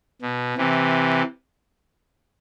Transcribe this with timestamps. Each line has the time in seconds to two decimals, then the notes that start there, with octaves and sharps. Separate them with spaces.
0.22 B2
0.57 C3 E3